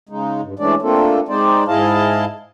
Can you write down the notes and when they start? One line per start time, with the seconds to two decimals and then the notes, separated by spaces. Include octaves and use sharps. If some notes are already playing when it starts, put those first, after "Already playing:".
0.09 C#3 G#3 D#4
0.41 G2
0.59 E3 G#3 A3 C#4 D4 D5
0.82 A3 A#3 C4 D4 F4 A4
1.29 G#3 C4 D#4 C5 D5
1.68 G#2 E4 G#4 D#5 F5 A5